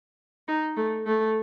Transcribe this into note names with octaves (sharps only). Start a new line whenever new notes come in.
D#4
A3
A3